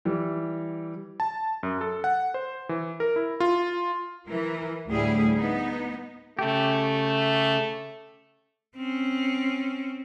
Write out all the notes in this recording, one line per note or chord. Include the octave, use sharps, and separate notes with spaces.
E3 G3
A5
F#2
A4
F#5
C5
E3
A#4
E4
F4
E3 A#4
D2 A2 G3 E4 G#4
B3 D#4
C#3 A3 G4
C4 C#4